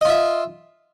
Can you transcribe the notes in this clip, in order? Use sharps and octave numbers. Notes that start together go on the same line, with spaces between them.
F4 D#5 E5